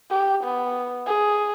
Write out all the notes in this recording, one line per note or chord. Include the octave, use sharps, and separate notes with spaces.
G4
B3
G#4